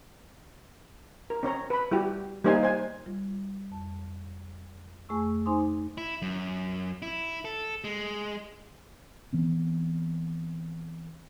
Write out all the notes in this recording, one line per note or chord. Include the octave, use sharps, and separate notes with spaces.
A#4
C4 C#4 C#5 A#5
B4 B5
G3 E4 F#4 G4
G3 A#3 D#4 C5 F5 G#5
C5 G#5
G3 F4
F2 A5
F2 A3 G#4 G#5 C#6 E6
D#4 C5 G#5 C6 D6 D#6
E4
F#2
E4
A4
G#3
E3 B3 C4